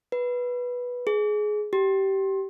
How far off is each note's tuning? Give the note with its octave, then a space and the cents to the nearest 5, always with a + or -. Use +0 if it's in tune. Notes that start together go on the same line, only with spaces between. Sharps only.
B4 -10
G#4 +15
G4 -20